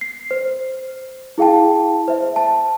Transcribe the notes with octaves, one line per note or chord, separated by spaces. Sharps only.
C7
C5
E4 G#4 F5 G5 A5
C5 E5
A5